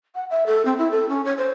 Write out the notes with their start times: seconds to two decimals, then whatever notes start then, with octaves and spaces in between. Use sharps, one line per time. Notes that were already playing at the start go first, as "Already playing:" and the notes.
0.15 F#5
0.30 E5
0.46 A4
0.65 C4
0.78 E4
0.91 A4
1.09 C#4
1.25 C#5
1.38 C5